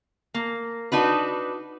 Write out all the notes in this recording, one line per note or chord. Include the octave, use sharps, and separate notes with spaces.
A#3
D4 D#4 F#4 B4